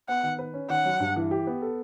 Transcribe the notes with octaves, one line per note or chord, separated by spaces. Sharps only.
B3 F#5
D#3
B4
C#4
D#3 F#5
F#3
G2
E3
G4
B3
A4